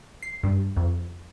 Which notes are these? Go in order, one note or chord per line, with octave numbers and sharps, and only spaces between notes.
C7
G2
F2